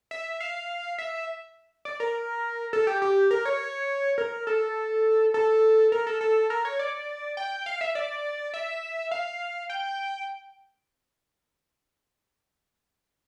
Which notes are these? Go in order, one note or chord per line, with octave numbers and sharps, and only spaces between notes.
E5
F5
E5
D5
A#4
A4
G4
G4
A#4
C#5
A#4
A4
A4
A#4
A4
A4
A#4
C#5
D5
G5
F5
E5
D5
E5
F5
G5